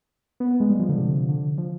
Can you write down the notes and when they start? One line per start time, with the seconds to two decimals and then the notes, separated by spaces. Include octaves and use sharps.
0.40 B3
0.50 B3
0.60 G#3
0.70 G3
0.79 F3
0.89 D3
0.99 C3
1.29 D3
1.58 F3